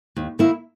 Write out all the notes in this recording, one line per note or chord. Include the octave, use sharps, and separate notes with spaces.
D#2
D#3 A#3 E4